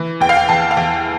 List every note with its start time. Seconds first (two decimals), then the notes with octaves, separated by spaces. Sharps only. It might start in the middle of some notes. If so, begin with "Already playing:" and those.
Already playing: E3
0.21 E2 G5
0.29 F5
0.37 G5
0.49 E2 A5
0.71 F5
0.77 E2 G5